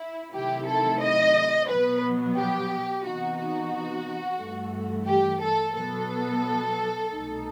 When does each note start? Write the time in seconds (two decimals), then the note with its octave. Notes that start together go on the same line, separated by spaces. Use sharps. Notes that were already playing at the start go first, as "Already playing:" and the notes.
Already playing: E4
0.33 C3 D#3 F#3 A3 E4 G4
0.66 A4
1.01 D#5
1.68 B2 F#3 B3 B4
2.36 G4
3.04 C3 E3 B3 D#4 F#4
3.38 F#4
4.39 G2 E3 A3
5.07 G4
5.42 A4
5.75 B2 F#3 B3 A4
7.11 C2 B2 A3 D#4